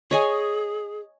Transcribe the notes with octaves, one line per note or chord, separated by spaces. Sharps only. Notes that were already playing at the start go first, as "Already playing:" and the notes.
G#4 C#5 D#5 G#5